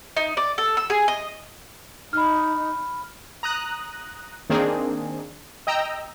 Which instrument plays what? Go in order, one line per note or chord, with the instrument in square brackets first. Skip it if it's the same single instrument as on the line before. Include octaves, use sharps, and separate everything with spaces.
[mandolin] D#4
D5
A4
E6
G#4
D#5
[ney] D#4 [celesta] B5 F6
[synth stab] A#5 D#6 F#6
D#3 A#3 C4 D4 G#4
D#5 G5 A#5 E6